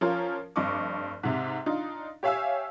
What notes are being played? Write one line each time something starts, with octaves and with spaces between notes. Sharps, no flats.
F3 C#4 F4 A#4
F1 G2 D#5 C#6 D6
G#2 C3
D4 D#4 F4
G4 C#5 E5 F5 G#5 E6